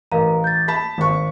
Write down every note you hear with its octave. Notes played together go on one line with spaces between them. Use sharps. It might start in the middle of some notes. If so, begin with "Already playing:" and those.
A1 A#4 F5 A#5
G6 A6
A5 B5 B6
G#1 C#6